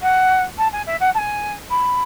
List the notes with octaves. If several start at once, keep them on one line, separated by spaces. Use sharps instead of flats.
F#5
A5
G#5
E5
F#5
A5
G#5
B5